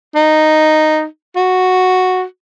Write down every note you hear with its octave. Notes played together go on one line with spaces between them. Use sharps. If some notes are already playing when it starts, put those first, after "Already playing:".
D#4
F#4